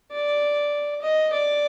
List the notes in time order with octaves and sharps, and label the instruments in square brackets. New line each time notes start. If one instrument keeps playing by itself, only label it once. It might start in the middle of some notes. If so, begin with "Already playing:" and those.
[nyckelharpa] D5
D#5
D5